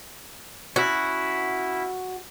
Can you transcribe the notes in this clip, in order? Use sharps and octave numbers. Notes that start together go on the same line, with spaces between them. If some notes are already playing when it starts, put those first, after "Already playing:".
C#4 E4 F#4